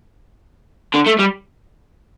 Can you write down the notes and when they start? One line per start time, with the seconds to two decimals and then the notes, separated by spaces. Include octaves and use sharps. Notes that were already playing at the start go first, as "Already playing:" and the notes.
0.94 D3
1.06 A3
1.19 G3